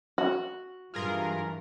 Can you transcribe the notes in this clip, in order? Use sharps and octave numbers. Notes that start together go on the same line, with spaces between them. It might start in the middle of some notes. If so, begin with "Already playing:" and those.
F#4
G2 E3 F4 G#4 A#4